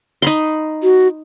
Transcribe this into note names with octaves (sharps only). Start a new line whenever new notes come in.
D#4 B5 C6
F#4